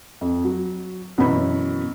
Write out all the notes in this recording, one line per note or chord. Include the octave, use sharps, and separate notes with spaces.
F2
F#3
F#2 B2 E3 B5